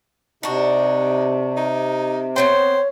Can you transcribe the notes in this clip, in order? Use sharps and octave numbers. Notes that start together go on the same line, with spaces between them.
C3 D4 D#4 F#4
D#4
B3 C4 C5 C#5 G5